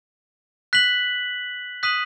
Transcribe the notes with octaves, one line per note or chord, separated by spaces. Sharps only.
F#6 B6 F#7
D#6 F#6 B6 D#7 F#7